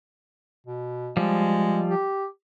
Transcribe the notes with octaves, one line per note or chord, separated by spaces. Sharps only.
B2
F3 G3 G#3
G4